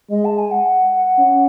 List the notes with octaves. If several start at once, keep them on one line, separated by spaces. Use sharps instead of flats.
G#3 D#5
A5
G#5
F#5
C#4